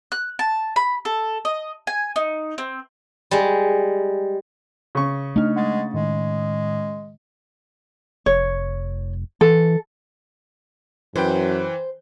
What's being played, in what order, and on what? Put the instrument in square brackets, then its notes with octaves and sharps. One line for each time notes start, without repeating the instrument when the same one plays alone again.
[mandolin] F#6
A5
B5
A4
D#5
G#5
D#4
C4
[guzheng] G3 G#3
[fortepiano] C#3 C#6
[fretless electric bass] A3 D4 [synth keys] D#4 D#5 F6
[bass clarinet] G#3 [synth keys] F#5 A6
[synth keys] A2 D#3 [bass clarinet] G#3
[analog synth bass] F1 [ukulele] C#5
[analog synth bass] E3 [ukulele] A4
[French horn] F#2 [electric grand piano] E3 B4 G5 [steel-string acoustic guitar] C5